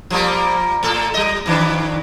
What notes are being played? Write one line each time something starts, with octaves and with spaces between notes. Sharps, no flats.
F3 G3 A#3
A2 A4
G3 D#5
F2 D#3 D4